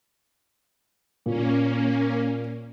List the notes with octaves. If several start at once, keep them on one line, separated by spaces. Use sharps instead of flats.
A#2 A#3 C#4